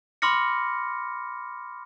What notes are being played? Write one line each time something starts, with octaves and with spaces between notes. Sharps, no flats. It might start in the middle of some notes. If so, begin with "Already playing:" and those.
B5 C6 D6 F6 A#6 C#7